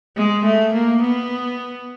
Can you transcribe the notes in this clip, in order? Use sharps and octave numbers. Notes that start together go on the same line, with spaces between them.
G#3
A3
A#3
B3